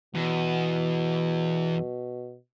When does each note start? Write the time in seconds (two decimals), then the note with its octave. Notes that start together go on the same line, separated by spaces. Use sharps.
0.15 E2 B2